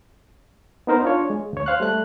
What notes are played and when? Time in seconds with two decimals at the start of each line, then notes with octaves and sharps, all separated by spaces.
0.87 B3 D#4 A#4 C5
1.03 D4 F4 C#5
1.30 G#3
1.53 D2 C#5
1.66 C5 F5 F#6
1.80 G3 A3 F#6